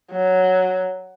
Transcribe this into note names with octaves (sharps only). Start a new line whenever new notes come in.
F#3